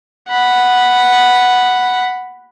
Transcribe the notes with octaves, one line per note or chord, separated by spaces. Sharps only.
F#5 B5